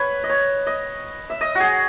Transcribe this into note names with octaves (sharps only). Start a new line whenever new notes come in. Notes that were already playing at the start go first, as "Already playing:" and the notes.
Already playing: B4 C#5
D#5
C#5
D#5
E5
D#5
F#4 G#4